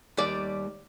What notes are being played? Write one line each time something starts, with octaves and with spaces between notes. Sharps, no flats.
D#2 G3 D5